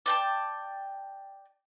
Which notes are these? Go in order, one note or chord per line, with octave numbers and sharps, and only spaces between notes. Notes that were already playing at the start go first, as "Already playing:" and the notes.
D5 G5 A5